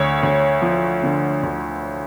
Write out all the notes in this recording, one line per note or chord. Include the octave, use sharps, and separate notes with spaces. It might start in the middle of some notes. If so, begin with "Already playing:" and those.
Already playing: D2 D3 C#5
D2
F3
D3
D2